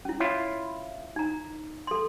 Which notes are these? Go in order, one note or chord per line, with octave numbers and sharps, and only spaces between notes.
C#4 E4
E4 F4 C#5
D#4 A#5
A4 C6